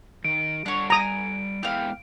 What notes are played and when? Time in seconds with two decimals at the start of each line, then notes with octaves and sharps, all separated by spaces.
0.24 D#3 D7
0.66 G3 D4 A4 C#5 F#5
0.90 G#5 A#5 D#6
1.63 G#3 B3 E4 G4 F5